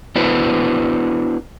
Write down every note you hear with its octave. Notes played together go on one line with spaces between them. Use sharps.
B3 D4 E4 F#4 B4 C5